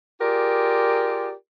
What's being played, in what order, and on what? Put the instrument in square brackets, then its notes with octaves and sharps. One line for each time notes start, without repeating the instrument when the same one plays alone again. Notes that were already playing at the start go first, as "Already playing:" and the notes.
[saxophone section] F4 G4 G#4 A#4 D5